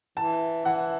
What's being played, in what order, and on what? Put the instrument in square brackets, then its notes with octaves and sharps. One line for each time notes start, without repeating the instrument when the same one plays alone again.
[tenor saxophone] E3 [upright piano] A5
[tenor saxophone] E3 [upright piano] F#5